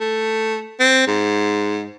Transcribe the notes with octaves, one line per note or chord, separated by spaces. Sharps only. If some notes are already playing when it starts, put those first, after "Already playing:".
A3
C4
G#2